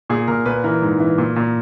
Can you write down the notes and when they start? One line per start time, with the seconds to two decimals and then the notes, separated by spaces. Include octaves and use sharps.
0.10 A#2 G#4
0.28 A#2 A#4
0.46 A#2 B4
0.64 E3 A#4
0.82 G#2
1.00 E3
1.18 A#2
1.36 A#2